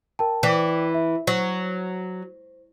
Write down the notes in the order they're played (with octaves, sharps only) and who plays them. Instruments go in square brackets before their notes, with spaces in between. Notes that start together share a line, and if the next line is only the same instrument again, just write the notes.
[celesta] A#4 G5 A5
[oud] E3 [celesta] D5 G5 D6
[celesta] E5
[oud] F#3 [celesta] C5